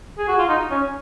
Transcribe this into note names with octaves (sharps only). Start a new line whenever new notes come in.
G#4
F#4
F4
D#4
C#4